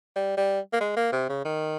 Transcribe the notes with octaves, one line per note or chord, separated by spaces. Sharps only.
G3
G3
A#3
G#3
A#3
C3
C#3
D#3